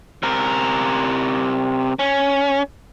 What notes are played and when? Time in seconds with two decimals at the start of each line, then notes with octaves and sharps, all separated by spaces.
0.23 C3 A#4
1.99 C#4